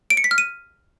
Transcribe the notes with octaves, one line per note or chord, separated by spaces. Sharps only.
D7
C#7
B6
F6
D#7